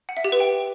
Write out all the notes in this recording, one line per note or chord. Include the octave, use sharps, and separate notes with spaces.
F#5
E5
G4
B4
G5